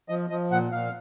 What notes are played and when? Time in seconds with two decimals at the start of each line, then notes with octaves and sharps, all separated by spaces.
0.09 F3 D#5
0.30 F3 D#5
0.51 A#2 F#5
0.72 A#2 F5